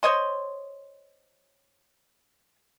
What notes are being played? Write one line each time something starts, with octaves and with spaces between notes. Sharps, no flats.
C5 C#5 D#5 C6